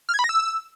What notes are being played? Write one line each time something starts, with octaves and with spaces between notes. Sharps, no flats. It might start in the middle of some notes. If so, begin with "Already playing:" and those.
F6
G#6
B5
A#6
E6